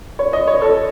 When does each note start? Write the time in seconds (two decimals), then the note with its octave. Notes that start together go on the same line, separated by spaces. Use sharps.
0.19 C#5
0.33 D#5
0.47 C#5
0.62 A4